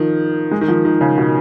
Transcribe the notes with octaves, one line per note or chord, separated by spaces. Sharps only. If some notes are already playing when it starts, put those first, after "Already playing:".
Already playing: D#3 F3
G#3
D#3
F3
D#3
C#3
B2